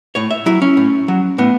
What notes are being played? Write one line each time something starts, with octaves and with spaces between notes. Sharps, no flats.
A2 C#5
E5
F#3 E4
C#4
A2
F#3
A2 B3